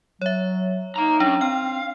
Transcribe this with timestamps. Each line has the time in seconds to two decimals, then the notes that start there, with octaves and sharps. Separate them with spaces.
0.21 F#3 C#5 E5
0.96 D#4 F5 A#5
1.20 F#3 C#4 D4
1.41 C4 F5 F6